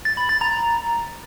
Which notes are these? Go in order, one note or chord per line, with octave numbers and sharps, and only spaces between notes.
A6
B5
A6
A#5